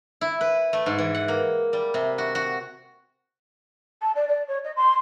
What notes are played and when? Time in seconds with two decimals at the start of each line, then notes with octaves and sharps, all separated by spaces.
0.21 E4
0.41 B4
0.73 A3
0.86 G#2
0.98 E3
1.15 F#5
1.28 A#3
1.73 G3
1.94 C3
2.18 F#4
2.35 F#4
4.02 A5
4.16 D5
4.28 D5
4.48 C#5
4.65 D#5
4.76 C6